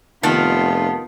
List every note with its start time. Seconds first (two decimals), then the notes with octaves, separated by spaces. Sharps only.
0.23 F1 D#3 B3 F4 F5 F#5 A5